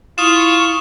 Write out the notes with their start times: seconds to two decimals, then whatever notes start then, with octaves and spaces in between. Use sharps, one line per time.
0.18 E4 F4 C#6 D#6 E7